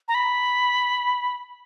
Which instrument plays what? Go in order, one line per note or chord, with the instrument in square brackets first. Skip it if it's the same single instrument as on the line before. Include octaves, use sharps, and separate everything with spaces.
[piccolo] A#5
B5